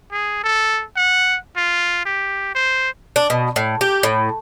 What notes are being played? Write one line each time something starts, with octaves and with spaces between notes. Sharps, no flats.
G#4
A4
F#5
F4
G4
C5
D4
B2
A2
G4
A2